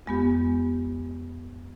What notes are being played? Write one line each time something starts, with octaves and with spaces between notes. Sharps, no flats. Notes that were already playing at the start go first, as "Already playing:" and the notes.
F2 G#3 B3 G4